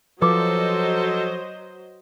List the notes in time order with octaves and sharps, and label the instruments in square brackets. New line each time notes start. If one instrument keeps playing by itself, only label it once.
[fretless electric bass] F3 [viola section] F#3 C5 D#5 [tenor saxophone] A4 [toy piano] B4 D6